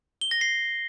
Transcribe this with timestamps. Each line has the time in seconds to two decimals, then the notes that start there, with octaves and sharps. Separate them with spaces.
0.21 G7
0.31 A#6
0.41 C7